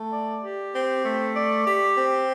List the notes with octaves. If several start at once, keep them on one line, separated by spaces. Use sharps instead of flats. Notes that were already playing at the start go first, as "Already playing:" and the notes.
Already playing: A3
D5
G4
C4
A3
D5
G4
C4